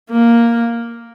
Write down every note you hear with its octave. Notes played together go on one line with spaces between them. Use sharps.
A#3